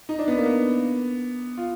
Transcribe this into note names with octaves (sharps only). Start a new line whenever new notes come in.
D#4
D4
B3
A#3
B3
F4